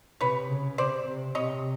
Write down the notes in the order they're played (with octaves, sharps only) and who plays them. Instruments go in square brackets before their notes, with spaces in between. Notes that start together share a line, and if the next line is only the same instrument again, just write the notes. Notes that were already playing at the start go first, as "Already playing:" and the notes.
[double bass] C3 [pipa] B4 C#5
[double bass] C#3
[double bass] C3 [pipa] C5 D5
[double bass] C3
[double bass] C3 [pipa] C#5 D#5